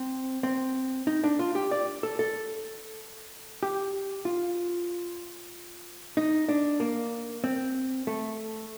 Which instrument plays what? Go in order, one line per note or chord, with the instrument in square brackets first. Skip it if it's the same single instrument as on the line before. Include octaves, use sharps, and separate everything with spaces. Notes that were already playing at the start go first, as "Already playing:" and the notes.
Already playing: [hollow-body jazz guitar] C4
C4
D#4
D4
F4
G4
D5
A4
A4
G4
F4
D#4
D4
A#3
C4
A3